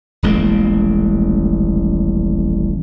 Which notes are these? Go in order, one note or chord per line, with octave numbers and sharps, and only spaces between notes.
D#1 A1 G#3 A#3